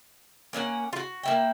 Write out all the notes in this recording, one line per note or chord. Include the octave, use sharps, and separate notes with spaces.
A#3 C#4 E5 F#5
F4 F#4
A#3 E4 G5